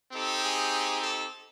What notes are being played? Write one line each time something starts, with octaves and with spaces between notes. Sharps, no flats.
C4 D#4 G4 A4
G#4
A4